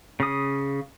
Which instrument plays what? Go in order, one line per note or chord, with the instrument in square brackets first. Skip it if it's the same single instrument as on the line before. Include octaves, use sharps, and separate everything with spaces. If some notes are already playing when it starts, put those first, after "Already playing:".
[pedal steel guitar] C#3 D#6